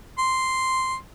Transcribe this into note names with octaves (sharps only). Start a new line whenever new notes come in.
C6